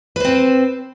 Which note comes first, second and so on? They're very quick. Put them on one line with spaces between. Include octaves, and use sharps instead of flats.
B4 C5 C4